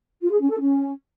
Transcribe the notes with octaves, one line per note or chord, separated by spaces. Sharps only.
F4
G#4
C#4
A4
C#4